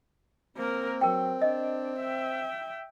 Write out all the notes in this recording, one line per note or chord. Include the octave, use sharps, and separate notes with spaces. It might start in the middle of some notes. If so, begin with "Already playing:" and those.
A#3 C4 A#4
F#3 A#4 G5
D4 D#5
E5 G5